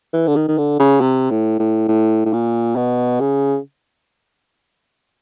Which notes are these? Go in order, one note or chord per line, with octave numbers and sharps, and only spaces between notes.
E3
D3
D#3
D#3
D3
C#3
C3
A2
A2
A2
A2
A#2
B2
C#3